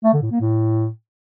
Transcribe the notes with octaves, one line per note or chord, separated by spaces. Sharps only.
A3
D3
A2
A#3
A2